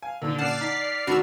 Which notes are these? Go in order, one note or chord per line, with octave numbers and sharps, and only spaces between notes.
F5 G#5
A#2 D3 D#3 E6
A#2 C#3 D5 F#5 A5 F6 C7 E7
D#4 B6
D2 D#3 F#4 B5 E6 F7